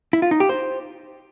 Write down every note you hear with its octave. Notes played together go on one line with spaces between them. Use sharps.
E4
F4
D#4
G4
C5